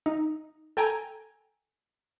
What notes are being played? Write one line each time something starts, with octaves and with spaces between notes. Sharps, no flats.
D#4
A4 G5 G#5 A#5